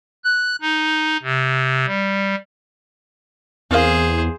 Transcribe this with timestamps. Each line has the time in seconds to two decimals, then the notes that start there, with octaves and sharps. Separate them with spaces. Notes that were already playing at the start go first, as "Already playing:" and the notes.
0.24 F#6
0.61 D#4
1.23 C3
1.87 G3
3.71 E2 C4 G#4 A#4 C5 F5